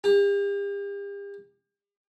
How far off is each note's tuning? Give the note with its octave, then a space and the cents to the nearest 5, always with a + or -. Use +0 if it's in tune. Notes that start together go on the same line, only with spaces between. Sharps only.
G4 +40